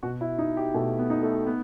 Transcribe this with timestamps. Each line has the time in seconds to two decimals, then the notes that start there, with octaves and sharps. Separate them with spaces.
0.03 B2 F#4
0.21 E4
0.38 D#4
0.57 G4
0.74 B2 A3
0.99 B3
1.10 D#4
1.23 A3
1.46 B3